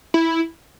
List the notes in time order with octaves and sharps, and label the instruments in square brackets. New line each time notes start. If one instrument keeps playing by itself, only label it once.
[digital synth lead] E4